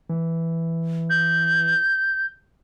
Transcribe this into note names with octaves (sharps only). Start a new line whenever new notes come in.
E3
G6